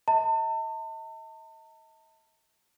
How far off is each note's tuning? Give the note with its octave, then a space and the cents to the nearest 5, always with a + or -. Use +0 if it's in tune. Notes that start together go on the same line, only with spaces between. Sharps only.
D#5 +45 A5 +40